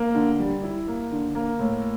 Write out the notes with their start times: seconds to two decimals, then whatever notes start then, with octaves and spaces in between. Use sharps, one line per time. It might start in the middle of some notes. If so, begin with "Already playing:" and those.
Already playing: A#3
0.15 D3
0.40 G3
0.63 E4
0.88 A#3
1.12 D3
1.35 A#3
1.59 A2